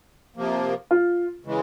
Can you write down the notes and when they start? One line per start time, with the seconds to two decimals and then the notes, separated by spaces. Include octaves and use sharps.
0.36 C3 F3 A#3
0.91 F4
1.45 C#3 E3 G#3